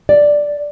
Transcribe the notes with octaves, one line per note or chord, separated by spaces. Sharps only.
D5